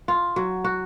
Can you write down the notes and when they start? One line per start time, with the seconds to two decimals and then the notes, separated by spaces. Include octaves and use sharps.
0.08 F4
0.36 F#3
0.64 F#4